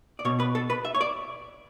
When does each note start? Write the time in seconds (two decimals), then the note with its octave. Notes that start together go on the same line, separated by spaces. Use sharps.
0.19 D5
0.25 B2 C#5
0.40 B4
0.55 A4
0.70 B4
0.85 E5
0.95 C#5
1.01 D5